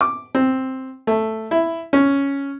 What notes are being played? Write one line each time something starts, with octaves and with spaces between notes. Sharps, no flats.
D6
C4
A3
E4
C#4